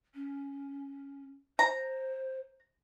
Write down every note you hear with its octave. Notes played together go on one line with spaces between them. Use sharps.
C#4
C5 A#5